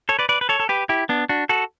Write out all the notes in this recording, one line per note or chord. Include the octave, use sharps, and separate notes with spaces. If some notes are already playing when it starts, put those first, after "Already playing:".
A4 C#5
B4 D5
B4 D5
B4
A4 C#5
A4
G4 B4
E4 G4
B3 D4
D4 F#4
F#4 A4